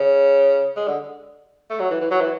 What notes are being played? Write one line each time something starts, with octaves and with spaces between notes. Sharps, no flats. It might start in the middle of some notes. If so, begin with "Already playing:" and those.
Already playing: C#3
G#3
D3
A3
F#3
E3
E3
F#3
E3